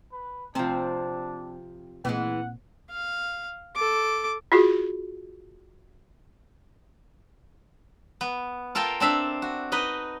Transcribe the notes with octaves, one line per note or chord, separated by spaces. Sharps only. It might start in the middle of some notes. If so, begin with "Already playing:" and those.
B4
C3 F3 C4 D4
A#2 E3 G#3 C4 F#5
F5
A4 D6
F4 F#4 G#4
B3
F4 A4 A#4 F5 G5
C4 D4 E5 F5
F#4
D#4 B4 D#5